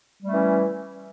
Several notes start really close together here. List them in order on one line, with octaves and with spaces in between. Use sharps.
G3 A3 C#4 E3